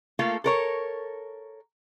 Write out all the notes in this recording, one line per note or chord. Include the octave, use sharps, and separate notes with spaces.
A3 A#3 F4 A4
A4 A#4 C#5